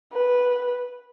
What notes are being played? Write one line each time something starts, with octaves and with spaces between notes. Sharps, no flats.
B4